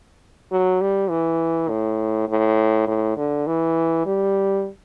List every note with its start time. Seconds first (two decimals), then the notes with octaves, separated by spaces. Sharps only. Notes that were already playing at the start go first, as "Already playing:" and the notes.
0.51 F#3
0.81 G3
1.10 E3
1.69 A2
2.28 A2
2.87 A2
3.17 D3
3.47 E3
4.06 G3